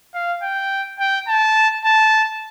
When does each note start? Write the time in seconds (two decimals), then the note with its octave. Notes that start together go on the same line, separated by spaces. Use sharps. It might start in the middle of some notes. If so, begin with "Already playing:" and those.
0.14 F5
0.43 G5
0.99 G5
1.28 A5
1.85 A5